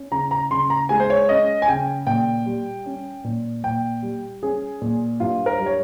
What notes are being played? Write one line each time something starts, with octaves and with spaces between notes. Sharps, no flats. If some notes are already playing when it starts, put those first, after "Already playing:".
Already playing: C#4
C#3 A#5
A#5
C#3 C6
A#5
G#3 G#5
C5
C#5
C#4 D#5
G#5
C#3 G5
A#2 G5
G3
C#4
A#2
A#2 G5
G3
C#4 G#4
A#2
G2 F4
A#4
G3
C#5